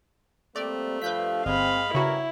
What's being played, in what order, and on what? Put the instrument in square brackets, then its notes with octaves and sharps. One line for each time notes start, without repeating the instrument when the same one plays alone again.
[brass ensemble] G3 A#3 C4 [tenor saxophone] A3 [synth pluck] D5
[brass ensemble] G2 F3 F5 [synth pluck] B4 G6 B6
[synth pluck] G1 [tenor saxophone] G#3 [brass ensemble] C4 [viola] F5 B5
[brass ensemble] G2 A#4 [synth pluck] C#3 F#4 [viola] E4 [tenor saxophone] C#5